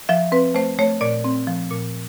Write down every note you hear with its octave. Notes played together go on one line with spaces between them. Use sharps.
F3 E5
C4 B4
A3 C5
A3 C#5
A#2 D5
C4
F3
A#2